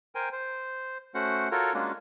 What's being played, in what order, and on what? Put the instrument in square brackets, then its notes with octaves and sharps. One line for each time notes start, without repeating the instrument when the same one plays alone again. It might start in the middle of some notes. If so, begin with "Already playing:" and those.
[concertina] A#4 C5 G5 G#5
C5
A3 C#4 F#4 C5 F#5
F4 F#4 A4 A#4 C#5
G#3 A#3 C#4 D4 F4 F#4